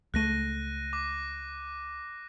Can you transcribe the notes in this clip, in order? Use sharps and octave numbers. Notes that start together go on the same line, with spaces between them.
C#2 A3 F#6 A#6 D#7
D6